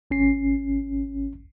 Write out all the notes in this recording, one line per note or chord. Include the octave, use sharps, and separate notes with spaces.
G#1 C#4 C7